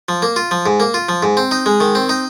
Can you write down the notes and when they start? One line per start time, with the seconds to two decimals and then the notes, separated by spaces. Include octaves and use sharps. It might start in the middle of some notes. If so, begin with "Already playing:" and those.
0.09 F3
0.22 A#3
0.36 F4
0.51 F3
0.66 G#2
0.80 A#3
0.94 F4
1.09 F3
1.23 G#2
1.37 C4
1.51 D#4
1.66 G#3
1.80 D#3
1.95 C4
2.09 D#4